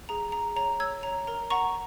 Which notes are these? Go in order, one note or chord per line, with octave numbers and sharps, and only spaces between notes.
G#4 A#5
G#4 A#5
C#5 A#5
C#5 E6 G#6
C#5 A#5
A#4 A#5
F#5 A#5 C#6